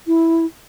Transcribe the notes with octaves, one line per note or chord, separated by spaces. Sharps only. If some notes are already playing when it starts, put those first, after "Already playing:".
E4